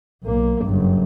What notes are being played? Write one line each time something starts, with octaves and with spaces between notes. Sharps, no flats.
B1 A#3
F#1 G2